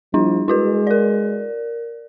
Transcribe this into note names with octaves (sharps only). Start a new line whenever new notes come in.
F3 G3 D4 E4
G#3 E4 F#4 B4
A#4 D5